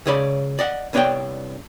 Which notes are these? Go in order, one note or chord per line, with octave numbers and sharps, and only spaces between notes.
C#2 C#3 G#4 C#5 D5 B5
D5 D#5 F#5
C2 B3 D4 C#5 D5 G5